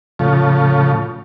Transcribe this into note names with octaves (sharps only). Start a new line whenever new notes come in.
A2 C#3 F3